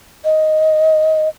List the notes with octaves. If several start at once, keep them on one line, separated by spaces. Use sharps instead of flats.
D#5